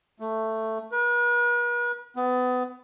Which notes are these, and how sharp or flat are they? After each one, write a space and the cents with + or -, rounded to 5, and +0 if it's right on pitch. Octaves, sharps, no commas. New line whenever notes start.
A3 +10
B4 -45
B3 +30